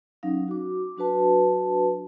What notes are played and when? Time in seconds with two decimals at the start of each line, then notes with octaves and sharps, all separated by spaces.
0.23 F#3 C#4 D#4 F5
0.48 F#4 D6
0.97 F#3 D4 F#4 B4 A5